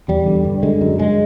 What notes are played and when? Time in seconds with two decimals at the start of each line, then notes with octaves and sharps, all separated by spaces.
0.08 E2 G3
0.27 D3
0.45 G2
0.63 D3 G#3
0.81 F#2
0.99 C#3 G#3